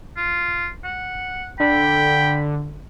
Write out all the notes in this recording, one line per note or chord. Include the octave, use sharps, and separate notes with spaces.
F4
F#5
D3 G5 B5